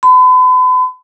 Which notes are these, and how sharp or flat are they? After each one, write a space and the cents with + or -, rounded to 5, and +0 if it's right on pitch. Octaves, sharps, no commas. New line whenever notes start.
B5 +40